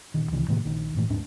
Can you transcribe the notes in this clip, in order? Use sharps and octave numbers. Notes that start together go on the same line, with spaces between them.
D#1 D#2 D#3
C#2 C3 E3
A2 C3 D#3 A#3
A#1 D#3
F#1 A2 E3 A3
D#2 G#2 C4 D4